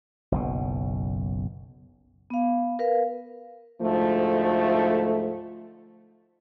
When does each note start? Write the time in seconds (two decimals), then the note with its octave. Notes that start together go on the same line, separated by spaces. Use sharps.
0.32 F#1 B1 B2
2.30 B3 F5
2.79 A#4 B4 F5
3.81 D2 G#2 F3 A3